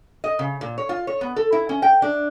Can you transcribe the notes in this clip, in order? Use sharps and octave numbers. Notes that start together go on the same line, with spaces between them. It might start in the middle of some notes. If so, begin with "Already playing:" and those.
D#5
C#3
A#2
C#5
F4
C#5
B3
A4
E4
C#4
G5
D4